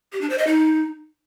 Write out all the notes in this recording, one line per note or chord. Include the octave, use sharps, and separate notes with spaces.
G4
D4
C5
D#5
D#4